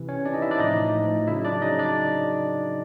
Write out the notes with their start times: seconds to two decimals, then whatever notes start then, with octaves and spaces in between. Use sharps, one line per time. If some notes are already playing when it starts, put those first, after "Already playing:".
Already playing: C3 E3
0.08 C#4 C#5
0.25 C3 D4 D5
0.29 E3 D#4 D#5
0.42 E4 E5
0.51 D4 D5
0.59 A2 F3 D#4 D#5
0.94 A2 F3
1.27 C#3 F#3 E4 E5
1.45 D4 D5
1.62 C#3 F#3 D#4 D#5
1.79 D4 D5